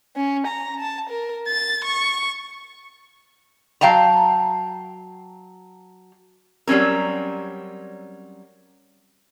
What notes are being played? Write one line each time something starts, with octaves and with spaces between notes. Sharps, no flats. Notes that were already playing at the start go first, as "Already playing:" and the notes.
C#4
A#5
A5
A#4
A6
C#6
F#3 F5 G5 A5 A#5
F#3 G3 C4 C#4 A#4